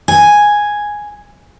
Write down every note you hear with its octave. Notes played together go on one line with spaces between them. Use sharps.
G#5